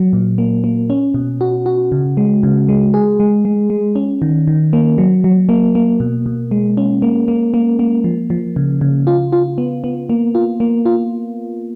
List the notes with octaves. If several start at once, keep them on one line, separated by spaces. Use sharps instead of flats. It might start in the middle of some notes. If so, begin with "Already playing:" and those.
Already playing: F#3
A#2
A#3
A#3
C#4
B2
F#4
F#4
C#3
G#3
C#3
G#3
G#4
G#3
G#3
G#3
C#4
D#3
D#3
A#3
F#3
F#3
A#3
A#3
B2
B2
G#3
C#4
A#3
A#3
A#3
A#3
F3
F3
C#3
C#3
F4
F4
B3
B3
A#3
F4
A#3
F4